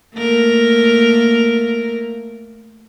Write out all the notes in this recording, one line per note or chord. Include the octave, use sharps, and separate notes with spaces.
A3 A#3 A#4